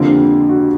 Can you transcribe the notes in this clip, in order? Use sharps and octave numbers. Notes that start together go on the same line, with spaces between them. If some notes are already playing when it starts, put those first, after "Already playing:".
Already playing: F2 D3 F3 A#3 G4
F#4